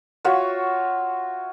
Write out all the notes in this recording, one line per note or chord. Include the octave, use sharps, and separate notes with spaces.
F4 F#4 C#5 E5